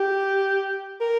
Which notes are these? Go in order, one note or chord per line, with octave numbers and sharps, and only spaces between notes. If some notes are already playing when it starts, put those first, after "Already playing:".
Already playing: G4
A#4